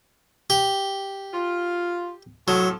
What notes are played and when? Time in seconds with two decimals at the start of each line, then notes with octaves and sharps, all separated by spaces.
0.50 G4
1.34 F4
2.48 A2 F3 F#3 A4